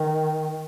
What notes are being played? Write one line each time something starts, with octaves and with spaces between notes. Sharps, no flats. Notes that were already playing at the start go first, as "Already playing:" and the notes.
Already playing: D#3